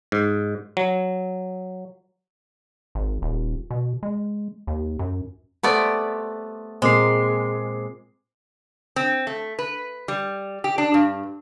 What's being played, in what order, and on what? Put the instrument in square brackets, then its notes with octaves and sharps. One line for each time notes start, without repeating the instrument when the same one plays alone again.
[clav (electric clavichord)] G#2
F#3
[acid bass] G#1
D#1
B2
G#3
D#2
F#2
[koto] A3 B3 D5 [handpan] G4 C5
[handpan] A#2 C4 A#4 [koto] G#3 [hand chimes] C5 D6 C7
[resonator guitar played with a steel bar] C4
A3
B4
G3
G4
D4
G2